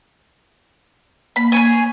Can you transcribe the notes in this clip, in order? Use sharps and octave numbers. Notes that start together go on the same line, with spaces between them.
A#3 B5
G#4 C#5 G#5